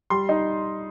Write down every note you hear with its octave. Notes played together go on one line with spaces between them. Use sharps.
G3 C6
D#4